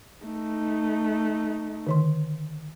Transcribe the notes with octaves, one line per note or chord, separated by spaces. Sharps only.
A3 D#4
D3 D#3 C6